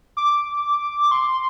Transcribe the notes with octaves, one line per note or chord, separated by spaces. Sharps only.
D6
C6